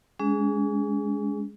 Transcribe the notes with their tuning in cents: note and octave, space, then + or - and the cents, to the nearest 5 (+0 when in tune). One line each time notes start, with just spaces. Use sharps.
G#3 +0 C#4 +45 G#4 +0